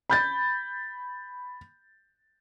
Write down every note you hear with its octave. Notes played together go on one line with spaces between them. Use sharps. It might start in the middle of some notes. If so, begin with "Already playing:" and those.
B5 G6 A6